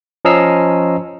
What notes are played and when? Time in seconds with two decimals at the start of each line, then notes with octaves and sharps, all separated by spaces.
0.25 F3 C#4 D#5 A#5 E6 C7